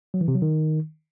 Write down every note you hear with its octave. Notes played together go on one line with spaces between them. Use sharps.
F#3
E3
C3
F#3
D#3